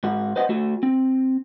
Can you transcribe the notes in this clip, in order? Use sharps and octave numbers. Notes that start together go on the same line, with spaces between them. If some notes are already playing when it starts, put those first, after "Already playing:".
G#2 F#4
B4 C5 D#5 F#5
A3 F#4
C4